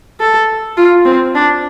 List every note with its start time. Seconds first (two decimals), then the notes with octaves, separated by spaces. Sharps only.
0.20 A4
0.77 F4
1.05 C4
1.35 D4